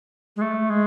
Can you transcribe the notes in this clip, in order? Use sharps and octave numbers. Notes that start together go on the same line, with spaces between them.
G#3
A3
G#3